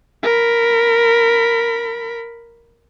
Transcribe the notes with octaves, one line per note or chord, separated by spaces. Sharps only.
A#4 B5